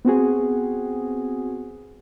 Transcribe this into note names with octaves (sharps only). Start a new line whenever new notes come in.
B3 C4 F#4 G#4